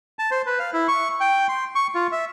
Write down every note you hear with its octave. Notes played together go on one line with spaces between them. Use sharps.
A5
C5
B4
F5
E4
C#6
G5
C6
C#6
F4
E5